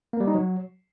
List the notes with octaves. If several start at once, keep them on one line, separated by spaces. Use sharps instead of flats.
A#3
G3
D#4
F#3